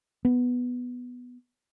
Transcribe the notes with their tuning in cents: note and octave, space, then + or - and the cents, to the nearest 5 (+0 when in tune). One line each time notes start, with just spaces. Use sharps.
B3 +0